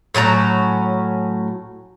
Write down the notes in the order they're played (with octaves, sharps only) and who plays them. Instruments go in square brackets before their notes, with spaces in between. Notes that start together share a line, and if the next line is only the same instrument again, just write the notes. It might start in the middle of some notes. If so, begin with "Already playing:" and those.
[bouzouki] A2 F#3 C#4 A#5